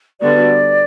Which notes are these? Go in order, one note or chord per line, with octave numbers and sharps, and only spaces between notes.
D3 G3 B3 F#4 D5